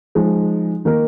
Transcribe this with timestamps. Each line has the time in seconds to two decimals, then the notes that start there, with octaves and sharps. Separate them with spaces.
0.15 F3 G#3 D#4
0.85 D#3 A#3 D#4 A#4